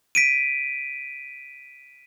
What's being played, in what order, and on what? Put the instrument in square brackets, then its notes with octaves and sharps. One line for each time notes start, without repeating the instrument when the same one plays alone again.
[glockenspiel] B6 D7 D#7